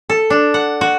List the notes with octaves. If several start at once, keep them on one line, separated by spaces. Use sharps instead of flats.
A4
D4
F#5
F#4